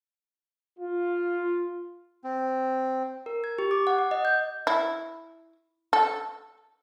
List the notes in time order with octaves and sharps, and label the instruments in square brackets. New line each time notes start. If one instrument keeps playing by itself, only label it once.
[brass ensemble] F4
[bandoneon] C4
[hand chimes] A#4
G#6
G4
D6
F#5
F#5
D#5
G6
[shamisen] E4
A4